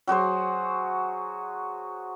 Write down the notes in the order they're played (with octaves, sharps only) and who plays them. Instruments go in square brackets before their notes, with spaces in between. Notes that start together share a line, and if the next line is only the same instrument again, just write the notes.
[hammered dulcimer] F#3 F#4 G#4 C5